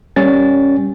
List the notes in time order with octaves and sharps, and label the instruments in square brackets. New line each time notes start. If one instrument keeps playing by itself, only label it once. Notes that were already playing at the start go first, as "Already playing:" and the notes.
[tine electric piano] G3 C#4 A6